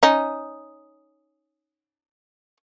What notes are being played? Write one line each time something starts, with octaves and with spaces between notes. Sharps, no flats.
C#4 D#4